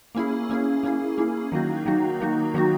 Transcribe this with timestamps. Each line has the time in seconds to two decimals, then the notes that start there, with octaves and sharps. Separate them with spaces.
0.15 A#3 C#4 E4 G#4
0.50 A#3 C#4 E4 G#4
0.83 A#3 C#4 E4 G#4
1.18 A#3 C#4 E4 G#4
1.52 D#3 F#3 A#3 D#4 F#4
1.86 D#3 F#3 A#3 D#4 F#4
2.21 D#3 F#3 A#3 D#4 F#4
2.54 D#3 F#3 A#3 D#4 F#4